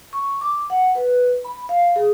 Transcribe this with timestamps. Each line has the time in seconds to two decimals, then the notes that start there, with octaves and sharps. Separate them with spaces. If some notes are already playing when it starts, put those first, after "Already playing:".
0.13 C#6
0.41 D6
0.70 F#5
0.95 B4
1.45 B5
1.69 F5
1.96 G#4